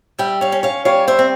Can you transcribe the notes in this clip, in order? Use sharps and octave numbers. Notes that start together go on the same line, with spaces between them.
G3 E5 G5
C#5 F5
C#4
C#5 F5
G3 C#5 F5
C5 E5
C4